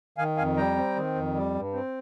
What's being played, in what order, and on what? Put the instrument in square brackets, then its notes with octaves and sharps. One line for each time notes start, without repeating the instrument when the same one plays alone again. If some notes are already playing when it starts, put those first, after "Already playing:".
[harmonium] D#3 F5 G#5
F2 F5 G#5
G3 G5 A#5
C4
D#3
F2
G3
G2
C4